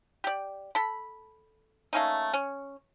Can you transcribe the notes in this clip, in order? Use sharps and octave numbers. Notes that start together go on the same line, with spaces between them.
G4 D5
A4 B5
A3 A#3 C#4 D#4
C#4